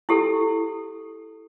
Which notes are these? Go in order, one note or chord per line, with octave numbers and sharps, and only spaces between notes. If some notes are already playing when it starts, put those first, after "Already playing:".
E4 G4 A4